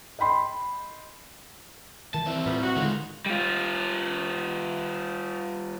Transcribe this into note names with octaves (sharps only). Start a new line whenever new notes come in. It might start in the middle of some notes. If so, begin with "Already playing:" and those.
D#5 G5 B5 C6
D#3 E3 A5
E3 C4 E4
A2 G3 B3 F4
F#4
D3 D#3 G#3 F4
G3 F4